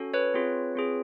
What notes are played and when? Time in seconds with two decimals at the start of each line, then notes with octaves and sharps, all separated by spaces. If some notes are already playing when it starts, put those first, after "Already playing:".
Already playing: C#4 F#4 A4
0.14 B4 C#5
0.34 C4 F4 G#4
0.76 C4 F4 G#4